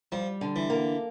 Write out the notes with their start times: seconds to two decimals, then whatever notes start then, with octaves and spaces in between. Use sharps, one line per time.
0.12 F3 G3
0.41 D3
0.56 E3
0.70 A#3